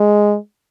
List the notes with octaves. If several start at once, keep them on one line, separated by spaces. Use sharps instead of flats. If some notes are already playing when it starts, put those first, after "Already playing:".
Already playing: G#3